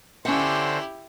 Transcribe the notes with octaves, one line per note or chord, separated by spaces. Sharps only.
D3 C#4 E4 G4 C5 F#5